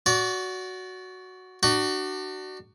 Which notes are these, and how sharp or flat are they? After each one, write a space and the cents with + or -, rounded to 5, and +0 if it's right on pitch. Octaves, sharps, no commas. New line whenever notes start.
F#4 +0 D5 -30
D4 +30 F#4 +20